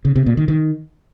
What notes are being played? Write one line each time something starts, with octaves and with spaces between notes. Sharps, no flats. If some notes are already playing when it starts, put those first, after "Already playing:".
C#3
C3
A#2
D#3
D#3